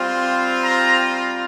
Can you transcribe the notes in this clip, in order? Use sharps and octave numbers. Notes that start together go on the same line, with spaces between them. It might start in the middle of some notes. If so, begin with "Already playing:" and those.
Already playing: G3 C4 F4
A#5